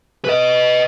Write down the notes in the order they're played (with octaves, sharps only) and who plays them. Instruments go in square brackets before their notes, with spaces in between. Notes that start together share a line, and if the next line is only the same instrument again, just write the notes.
[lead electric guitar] B4 D#5